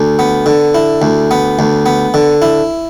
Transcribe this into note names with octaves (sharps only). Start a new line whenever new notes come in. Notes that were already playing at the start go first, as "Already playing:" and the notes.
Already playing: D2
B3
D3
E4
D2
B3
D2
B3
D3
E4